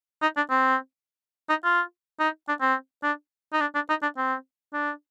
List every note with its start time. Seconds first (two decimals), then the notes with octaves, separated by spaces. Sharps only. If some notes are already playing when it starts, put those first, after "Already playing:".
0.22 D#4
0.37 D4
0.50 C4
1.49 D#4
1.64 F4
2.20 D#4
2.48 D4
2.61 C4
3.03 D4
3.53 D#4
3.61 D4
3.75 D4
3.89 D#4
4.02 D4
4.17 C4
4.73 D4